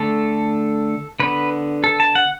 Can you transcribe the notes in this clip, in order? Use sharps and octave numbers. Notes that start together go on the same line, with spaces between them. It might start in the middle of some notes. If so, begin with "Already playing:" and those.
Already playing: D3 A3 A4
D3 B3 B4
A4
A5
F#5